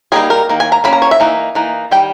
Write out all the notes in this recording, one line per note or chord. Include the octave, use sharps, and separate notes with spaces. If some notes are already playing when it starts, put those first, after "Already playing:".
G3 A#3 D#4 G#4
A#4
D#3 A#3
G#5
A#5
D#3 A#3 C#4 B5
A#5
C#5
E5
E3 A#3 D#4
E3 A#3 D#4
D#3 G3 G5